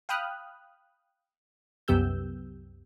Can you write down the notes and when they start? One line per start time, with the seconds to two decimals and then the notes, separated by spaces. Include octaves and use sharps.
0.09 F5 G5 B5 D#6 F6 F#6
1.88 C2 F#2 B3 G4 E6 G6